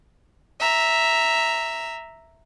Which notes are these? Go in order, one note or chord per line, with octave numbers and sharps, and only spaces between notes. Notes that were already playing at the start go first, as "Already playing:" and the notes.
E5 A#5